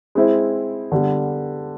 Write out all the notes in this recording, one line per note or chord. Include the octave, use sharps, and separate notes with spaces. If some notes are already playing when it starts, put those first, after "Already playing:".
G#3 C4 E4
D3 G3 B3